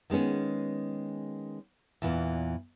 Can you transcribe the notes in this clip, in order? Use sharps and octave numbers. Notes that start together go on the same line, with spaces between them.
D#3 G#3 B3 C#4
E2 A#2 E3